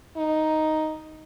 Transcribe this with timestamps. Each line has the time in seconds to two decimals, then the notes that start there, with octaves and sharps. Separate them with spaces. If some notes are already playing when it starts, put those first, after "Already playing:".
0.17 D#4